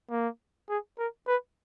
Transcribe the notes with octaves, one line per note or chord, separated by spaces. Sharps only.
A#3
G#4
A#4
B4